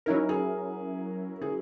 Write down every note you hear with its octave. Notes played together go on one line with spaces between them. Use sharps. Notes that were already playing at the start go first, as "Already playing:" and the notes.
F#3 C#4 D#4 E4 A#4
G#4
G#4